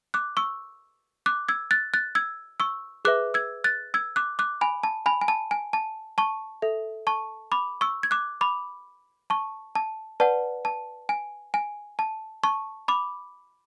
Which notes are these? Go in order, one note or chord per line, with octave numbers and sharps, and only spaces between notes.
D6 F#6
C#6 E6
D6 F#6
E6 G#6
F#6 A6
F#6 A6
E6 G#6
C#6 E6
G#4 B4 E5 D6 F#6
E6 G#6
F#6 A6
E6 G#6
D6 F#6
D6 F#6
G#5 B5
A5
G#5 B5
G#5
A5
G#5
A5
A5 C#6
A4 E5
A5 C#6
B5 D6
C#6 E6
G#6
D6 F#6
B5 D6
A5 C#6
A5
B4 D5 F#5 A5
A5
G#5
G#5
A5
A5 C#6
B5 D6